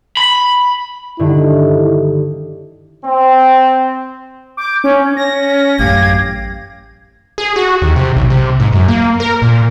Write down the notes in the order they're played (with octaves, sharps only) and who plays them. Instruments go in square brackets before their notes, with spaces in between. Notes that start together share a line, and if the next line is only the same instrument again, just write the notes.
[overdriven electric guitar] B5
[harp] G2 D3 D#3 [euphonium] E4
[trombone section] C4
[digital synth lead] D6 [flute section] G6
[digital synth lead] C#4 [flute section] C#5
[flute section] C#4 [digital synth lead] A#6
[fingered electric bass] A1 F#2 [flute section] G4 F5 G#6
[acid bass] G#4
F#4
D#2
C3
B1
C3
G#2
F#2
A#3
A#4
A#2